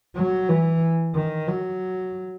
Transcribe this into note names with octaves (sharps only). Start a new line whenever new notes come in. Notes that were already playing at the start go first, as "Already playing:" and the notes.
F#3
E3
D#3
F#3